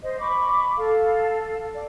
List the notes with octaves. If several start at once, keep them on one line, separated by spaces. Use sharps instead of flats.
C5 D#5
B5 C#6 D6
A4 F5
D5